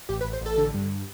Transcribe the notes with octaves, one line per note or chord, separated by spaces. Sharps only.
A1 G4
B4
A1
C5
A1 A4
D3
G2